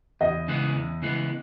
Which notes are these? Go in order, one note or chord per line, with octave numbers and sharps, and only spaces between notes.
E2 D#5
C#3 E3 G#3 B3
E2
C#3 E3 G#3 B3